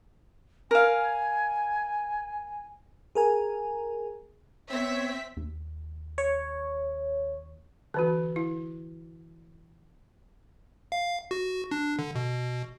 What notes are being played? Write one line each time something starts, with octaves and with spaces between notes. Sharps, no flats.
A#4 F5 G#5
G#4 A#4 G#5
B3 C4 C#5 E5 B6
D#2
C#5
D3 E3 F#4
E4
F5
F#4
D4
D3
B2